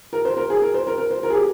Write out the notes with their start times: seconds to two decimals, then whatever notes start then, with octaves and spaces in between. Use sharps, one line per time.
0.13 A#4
0.25 C5
0.37 A#4
0.50 G#4
0.62 A#4
0.74 C5
0.87 A#4
0.98 A#4
1.10 C5
1.23 A#4
1.30 G#4
1.35 G4